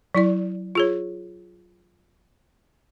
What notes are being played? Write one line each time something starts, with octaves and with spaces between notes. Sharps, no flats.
F#3 E4 D5
F4 G#4 C#5